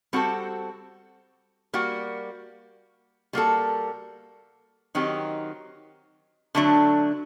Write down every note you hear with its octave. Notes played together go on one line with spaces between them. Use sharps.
G3 C4 F#4 A4
G3 A#3 F#4
G3 A#3 F#4 A4
D#3 F#3 C4 D#4 G4
D3 F#3 A3 D4